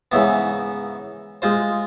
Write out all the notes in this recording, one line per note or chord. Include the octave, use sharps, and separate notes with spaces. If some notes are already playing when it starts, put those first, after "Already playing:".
G#2 C#3 E3 B3
G#3 F4 C5